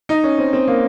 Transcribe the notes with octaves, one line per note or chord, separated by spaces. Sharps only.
D#4
C#4
C4
C4
A#3